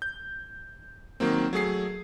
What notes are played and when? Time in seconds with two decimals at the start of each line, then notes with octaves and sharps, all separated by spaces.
0.02 G6
1.20 D#3 F#3 A#3 C4
1.53 F#3 A3 G#4 C7